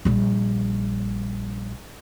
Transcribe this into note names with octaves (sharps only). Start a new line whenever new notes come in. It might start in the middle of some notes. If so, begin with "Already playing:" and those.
A#1 G3